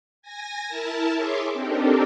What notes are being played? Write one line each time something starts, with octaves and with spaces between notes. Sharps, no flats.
G#5 A#6
E4 A#4 A5
G#4 C#5 E5 C6 D6
C4 D4 D#4 G4 A4 A#4